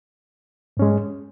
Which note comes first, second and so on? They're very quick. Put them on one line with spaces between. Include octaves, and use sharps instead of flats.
G#2 C#4 G#3